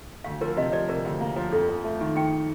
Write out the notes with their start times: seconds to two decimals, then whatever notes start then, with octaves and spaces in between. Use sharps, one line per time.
0.24 D2 F5
0.41 F3 A#4
0.57 C3 D#5
0.72 F3 D5
0.88 C3 A#4
1.05 D2
1.21 A#3
1.36 F3
1.52 F2 A4
1.69 F2
1.84 A3
2.01 D#3
2.15 D#3 G5